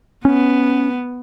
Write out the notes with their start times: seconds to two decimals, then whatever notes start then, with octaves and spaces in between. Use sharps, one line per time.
0.25 B3 C#4